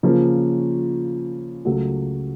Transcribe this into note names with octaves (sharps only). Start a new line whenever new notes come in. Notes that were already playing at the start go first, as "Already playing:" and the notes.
C#3 F3 A#3 C#4
C#2 C#3 F#3 A3